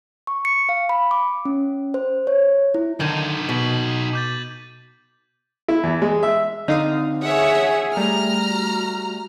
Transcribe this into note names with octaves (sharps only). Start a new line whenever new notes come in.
C#6
C#7
F5
B5
D6
C#4
C5
C#5
E4
D3 D#3 D#4 A4 G6 G#6 D#7
B2 B6 D#7 F#7
D6 G6 A6
E4
E2
G#3
E5
D3 C4 D#4 F5 D#6
G#4 C#5 E5 F#5
G3 A3 A#5 F6
F#4